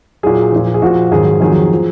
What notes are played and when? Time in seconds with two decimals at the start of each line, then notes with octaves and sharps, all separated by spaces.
0.23 A#2 F#3 G#4
0.52 A#2 F3
0.74 G#4
0.82 A#2 F3 F#4
1.12 G#2 D#3 F#3 G#4
1.41 F2 D#3 F#3 G#4
1.73 F3